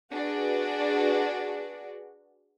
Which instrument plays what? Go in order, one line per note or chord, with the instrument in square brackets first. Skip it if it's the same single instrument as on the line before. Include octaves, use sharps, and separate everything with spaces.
[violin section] D4 F#4 G#4 B4 D5